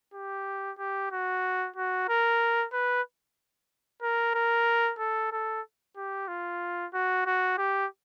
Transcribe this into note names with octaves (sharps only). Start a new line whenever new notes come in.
G4
G4
F#4
F#4
A#4
B4
A#4
A#4
A4
A4
G4
F4
F#4
F#4
G4